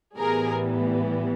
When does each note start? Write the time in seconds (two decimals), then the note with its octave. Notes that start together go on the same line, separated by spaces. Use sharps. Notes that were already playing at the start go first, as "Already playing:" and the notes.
0.18 A2 E3 G3 B3 G#4 A#4